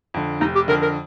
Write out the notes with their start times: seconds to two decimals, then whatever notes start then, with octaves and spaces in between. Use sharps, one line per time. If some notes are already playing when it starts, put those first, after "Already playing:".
0.14 F2 D3
0.41 F1 D#4
0.55 G4
0.68 F2 D3 A#4
0.82 A#4